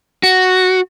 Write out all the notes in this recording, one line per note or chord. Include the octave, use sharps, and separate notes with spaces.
F#4